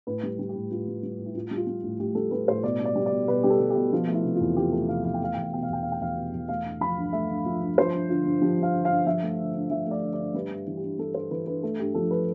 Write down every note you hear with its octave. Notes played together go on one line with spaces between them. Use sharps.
A2 B4
G3
G3
G4
A2
A2 F4
G3
G3
A2
E4
A2 F4
G3
F4
G3
A2
A2 G4
G3 A4
G3 B4
A2 C5
B2 D5
G3
D5
G3
D5
B2
B2 B4
G3 G4
A4
G3
G4
B2
F3 F4
A3
E4
C3
E2 F4
F3 G4
A3 A4
C3 F5
E2 F5
G5
A3 F5
E2 G5
F5
B2 G5
F5
E2 G5
A3 F5
G5
E2 F5
B2
E2
A3 F5
G2
F3 B5
G2
A3 E5
G2
F3
G2
F3 C5
G2
D3 F4
G2
F3 G4
G2 F5
D3
F5
G2
F3 E5
A3
D3
G2
F3 E5
A3 D5
D3
D5
G2
G3 B4
G2
E3
G4
G2
G3 A4
G2 C5
E3 B4
G2 B4
A3 A4
G2 G4
F3 A4
B4